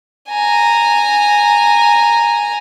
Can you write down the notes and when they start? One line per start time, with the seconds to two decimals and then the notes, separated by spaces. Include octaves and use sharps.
0.30 G#5 A#5